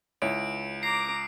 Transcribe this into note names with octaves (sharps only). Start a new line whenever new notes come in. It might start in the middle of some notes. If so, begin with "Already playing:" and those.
C#2 D#4 E4 C#5 D7
A#5 D6 C7